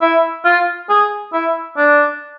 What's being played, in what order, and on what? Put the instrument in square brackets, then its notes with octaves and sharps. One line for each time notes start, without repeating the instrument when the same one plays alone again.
[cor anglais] E4
F4
G#4
E4
D4